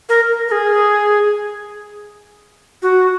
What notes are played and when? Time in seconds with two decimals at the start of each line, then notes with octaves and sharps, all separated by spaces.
0.09 A#4
0.48 A#4
0.52 G#4
2.82 F#4